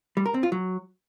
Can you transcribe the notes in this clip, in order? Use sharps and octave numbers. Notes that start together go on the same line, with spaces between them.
G3
A#4
C4
F4
F#3